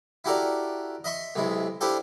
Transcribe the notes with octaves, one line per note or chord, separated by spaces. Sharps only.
E4 F#4 G4 A4 A#4 D5
D#5 E5 C6 C#6
B1 C3 G#3 E4
D4 E4 F4 G4 A4 C5